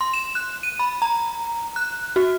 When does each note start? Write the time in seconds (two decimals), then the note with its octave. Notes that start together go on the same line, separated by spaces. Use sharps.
0.01 C6
0.14 E7
0.35 F#6
0.63 D#7
0.79 B5
1.02 A#5
1.76 F#6
2.16 F#4